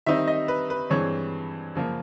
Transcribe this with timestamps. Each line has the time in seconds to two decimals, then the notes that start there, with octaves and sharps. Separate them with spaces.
0.06 D#3 G3 C4 D#4 E5
0.28 D#5
0.48 B4
0.70 B4
0.90 G2 E3 G#3 C4 C#5
1.75 F#2 C#3 F3 A#3